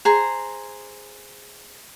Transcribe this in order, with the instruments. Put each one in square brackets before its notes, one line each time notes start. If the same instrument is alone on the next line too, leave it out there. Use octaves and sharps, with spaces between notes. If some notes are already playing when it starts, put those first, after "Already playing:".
[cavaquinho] G#4 C5 A#5